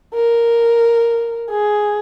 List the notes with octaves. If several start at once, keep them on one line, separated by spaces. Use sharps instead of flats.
A#4
G#4